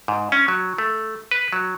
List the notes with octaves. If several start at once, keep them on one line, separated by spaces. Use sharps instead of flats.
G#2
C#4
F#3
A3
B4
F#3